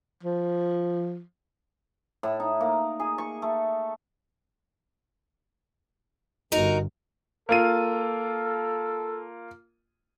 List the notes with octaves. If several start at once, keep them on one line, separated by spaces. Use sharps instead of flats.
F3
A2
D#4
A#3
G#4
C#6
A3
G1 D#4 F#4 A#4
A#3 F4 A4 D#7